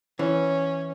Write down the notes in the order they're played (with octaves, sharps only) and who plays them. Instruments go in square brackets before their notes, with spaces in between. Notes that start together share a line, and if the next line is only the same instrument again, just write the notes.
[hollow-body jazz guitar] E3 [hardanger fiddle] C#4